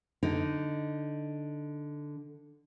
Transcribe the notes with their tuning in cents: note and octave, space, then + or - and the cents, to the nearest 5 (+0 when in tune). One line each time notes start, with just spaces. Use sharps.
D3 +0 D#4 +0